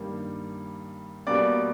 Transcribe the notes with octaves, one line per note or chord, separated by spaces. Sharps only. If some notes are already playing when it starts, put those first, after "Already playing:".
Already playing: G2 D#3 G3 A#3
B2 G3 A#3 D5 D6